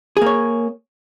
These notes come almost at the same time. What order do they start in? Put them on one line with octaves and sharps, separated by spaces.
G#4 A#3 C#5